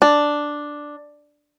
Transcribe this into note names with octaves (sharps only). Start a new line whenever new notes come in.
D4